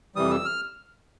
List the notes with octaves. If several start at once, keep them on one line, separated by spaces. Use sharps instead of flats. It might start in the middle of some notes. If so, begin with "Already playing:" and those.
F2 C3 E3 G3 D#6
E6
F6